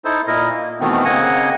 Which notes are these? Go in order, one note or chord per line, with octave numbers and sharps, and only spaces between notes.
D#4 E4 A4 C5
A#2 E4 A#4 D#5
A#3
B2 D#3 E3 A3 B3 C4
C#3 A#3 C4 D#5 F#5 G#5